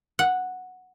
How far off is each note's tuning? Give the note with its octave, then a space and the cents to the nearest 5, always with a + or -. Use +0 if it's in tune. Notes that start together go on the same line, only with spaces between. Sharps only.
F#5 -5